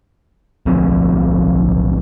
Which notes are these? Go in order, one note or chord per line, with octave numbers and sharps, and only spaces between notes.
D1 B1 F3 C4